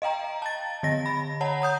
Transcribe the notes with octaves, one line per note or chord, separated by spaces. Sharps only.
D#5 F5 G5 A#5
A5 A6
D3 D#5 A#6
B5
C#5 F#5 A5 A#5
A#5 D#6 G6